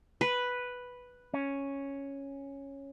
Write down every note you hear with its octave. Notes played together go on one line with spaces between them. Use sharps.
B4
C#4